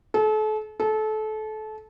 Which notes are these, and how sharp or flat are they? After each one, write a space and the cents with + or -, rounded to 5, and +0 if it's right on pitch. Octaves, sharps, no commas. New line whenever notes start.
A4 -35
A4 -25